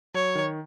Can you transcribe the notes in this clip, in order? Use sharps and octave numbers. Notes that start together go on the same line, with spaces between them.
F#3 C#5
D#3